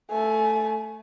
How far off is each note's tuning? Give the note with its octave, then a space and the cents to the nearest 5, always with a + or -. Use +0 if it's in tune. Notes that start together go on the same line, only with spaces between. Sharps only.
A3 +0 G#5 +25